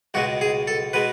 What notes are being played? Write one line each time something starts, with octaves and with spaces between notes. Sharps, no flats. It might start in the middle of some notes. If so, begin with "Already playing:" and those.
C#2 B2 G#3 F#4
G#4
A4
B2 G#3 B4